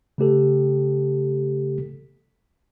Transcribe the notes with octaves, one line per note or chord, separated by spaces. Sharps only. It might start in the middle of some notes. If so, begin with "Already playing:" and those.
C#3 A3 G4 A4